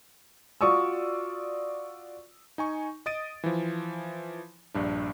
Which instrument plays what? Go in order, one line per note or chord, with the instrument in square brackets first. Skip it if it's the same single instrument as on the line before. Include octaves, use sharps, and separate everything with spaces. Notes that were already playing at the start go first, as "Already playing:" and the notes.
[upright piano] F4 F#4 D5 C#6 D#6 E6
[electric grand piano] D#4 G#5 C#6
D#5 D#6 A6 D7 D#7
E3 F3
A#1 G2 D4